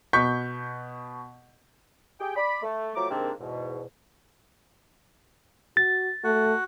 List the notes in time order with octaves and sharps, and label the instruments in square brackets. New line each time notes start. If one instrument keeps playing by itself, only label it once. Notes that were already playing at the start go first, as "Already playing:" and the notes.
[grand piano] B2 C#6 G6 B6
[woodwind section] G4 G#4 G5
D5 B5
A3
F3 F#3 A3 A#5 D6
G#2 C3 D#3 A#3 C4 D4
E2 G#2 B2
[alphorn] F#4 [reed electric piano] A6
[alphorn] A3 [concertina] F#4